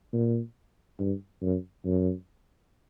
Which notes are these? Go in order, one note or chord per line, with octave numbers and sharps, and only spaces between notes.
A#2
G2
F#2
F#2